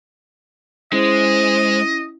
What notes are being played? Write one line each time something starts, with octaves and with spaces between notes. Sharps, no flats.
G#3 C#4 E4 C5 D#5